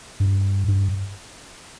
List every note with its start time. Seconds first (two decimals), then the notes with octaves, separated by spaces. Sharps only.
0.20 G2
0.68 G2